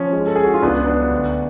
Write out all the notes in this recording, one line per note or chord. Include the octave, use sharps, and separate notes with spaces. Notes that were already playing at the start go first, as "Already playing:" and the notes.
Already playing: F3 C#4
G#3
A4
G#3 G#4
F#4
F4
C#2 B3 D4
F#3 B3 D4
D2